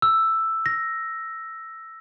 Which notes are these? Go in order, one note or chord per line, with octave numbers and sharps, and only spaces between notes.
E6
A#6